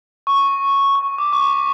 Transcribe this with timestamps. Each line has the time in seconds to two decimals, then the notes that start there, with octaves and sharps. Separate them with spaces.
0.27 C#6
0.95 C#6
1.18 D6
1.32 C#6
1.41 D6